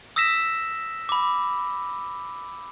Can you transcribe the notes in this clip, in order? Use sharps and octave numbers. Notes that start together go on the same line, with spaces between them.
D#6 E6 A#6 B6 E7
B5 D6